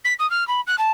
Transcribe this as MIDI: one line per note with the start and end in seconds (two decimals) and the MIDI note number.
0.04 0.13 95
0.19 0.29 87
0.30 0.46 89
0.47 0.60 83
0.67 0.75 90
0.78 0.91 81